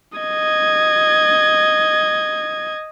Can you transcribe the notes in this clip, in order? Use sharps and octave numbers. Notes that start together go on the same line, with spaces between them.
D#5 G#6